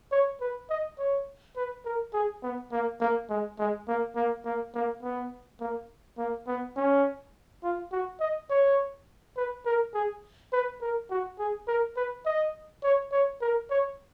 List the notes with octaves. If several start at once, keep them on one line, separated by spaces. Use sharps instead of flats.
C#5
B4
D#5
C#5
B4
A#4
G#4
B3
A#3
A#3
G#3
G#3
A#3
A#3
A#3
A#3
B3
A#3
A#3
B3
C#4
F4
F#4
D#5
C#5
B4
A#4
G#4
B4
A#4
F#4
G#4
A#4
B4
D#5
C#5
C#5
A#4
C#5